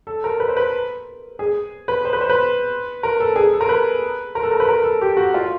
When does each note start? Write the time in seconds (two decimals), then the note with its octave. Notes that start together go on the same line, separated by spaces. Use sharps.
0.07 A4
0.24 A#4
0.40 B4
0.48 C5
0.57 B4
1.39 G#4
1.88 B4
2.05 C5
2.13 B4
2.21 C5
2.29 B4
3.03 A#4
3.20 A4
3.36 G#4
3.53 A4
3.61 A#4
3.69 B4
4.35 A#4
4.43 A4
4.51 A#4
4.60 B4
4.68 A#4
4.84 A4
5.01 G4
5.17 F#4
5.34 F4